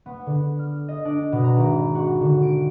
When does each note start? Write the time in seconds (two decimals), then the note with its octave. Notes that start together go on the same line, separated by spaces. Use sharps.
0.06 B3
0.26 D3
0.59 F6
0.88 D#5
1.05 D4
1.32 B2
1.44 A#5
1.56 G#1
1.95 F#4
2.21 D3
2.43 D7